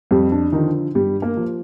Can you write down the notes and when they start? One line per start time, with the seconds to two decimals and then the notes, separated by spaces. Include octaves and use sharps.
0.11 F2 G3 G4
0.32 D4
0.52 D3 D#3 F3 D#4
0.95 G2 G3 G4
1.22 A#3 A#4
1.37 F3